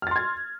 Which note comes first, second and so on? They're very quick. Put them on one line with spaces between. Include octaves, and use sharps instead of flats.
F6 A6 C6 G#6